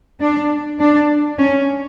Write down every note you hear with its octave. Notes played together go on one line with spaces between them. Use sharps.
D4
D4
C#4